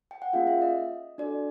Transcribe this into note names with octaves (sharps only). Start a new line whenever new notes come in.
G5
F#5
A#3 C#4 F4 G#4 F5
E5
D#5
D4 F#4 A4 D5